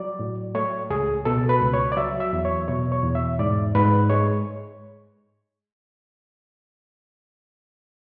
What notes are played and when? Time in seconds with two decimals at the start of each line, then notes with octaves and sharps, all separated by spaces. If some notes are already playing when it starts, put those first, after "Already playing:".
Already playing: F#3 D5
0.19 A2
0.55 A3 C#5
0.90 C#2 G#4
1.25 B2 A4
1.49 B4
1.61 C#2
1.74 C#5
1.92 D5
1.97 F#3 E5
2.20 E5
2.33 E2
2.45 C#5
2.68 B2 C#5
2.92 C#5
3.03 E2
3.15 E5
3.39 G#2 D5
3.75 G#2 B4
4.10 G#3 C#5